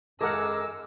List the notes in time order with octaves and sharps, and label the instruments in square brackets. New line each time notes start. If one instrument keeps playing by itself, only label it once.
[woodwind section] F#2 D6 [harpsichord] G#3 [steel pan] A4 A#4 F#5 [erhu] E6